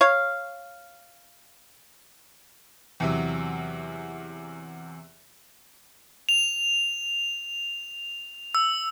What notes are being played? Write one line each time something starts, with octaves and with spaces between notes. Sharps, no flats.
C#5 F5
E2 C3 F#3
F7
E6